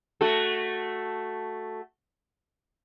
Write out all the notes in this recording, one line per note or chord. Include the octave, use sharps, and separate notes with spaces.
A3 F#4 A4